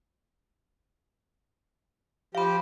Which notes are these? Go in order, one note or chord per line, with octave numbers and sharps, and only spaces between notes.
F3 G4 F5 B5